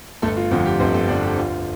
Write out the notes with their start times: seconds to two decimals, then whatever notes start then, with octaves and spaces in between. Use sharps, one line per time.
0.22 G1 A3 A4
0.37 F4
0.51 F2 D3 F4
0.65 G4
0.80 G1 C4 C5
0.94 A3 A4
1.08 F2 D3 D4 D5
1.23 G4
1.37 D2 F4